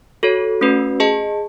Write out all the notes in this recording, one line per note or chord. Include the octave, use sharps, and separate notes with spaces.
F#4 A4 C#5
A3 C#4 F#4 B4
G#4 D#5 A5